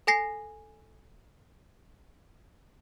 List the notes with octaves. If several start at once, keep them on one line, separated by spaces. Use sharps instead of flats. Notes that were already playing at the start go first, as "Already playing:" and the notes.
A4 G#5 A#6 C7